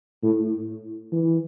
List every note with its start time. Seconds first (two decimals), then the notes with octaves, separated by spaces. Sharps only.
0.23 A2
1.12 E3